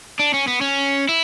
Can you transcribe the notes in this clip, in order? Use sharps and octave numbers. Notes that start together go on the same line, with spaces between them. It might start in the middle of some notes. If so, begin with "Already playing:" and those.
D4
C#4
B3
C#4
E4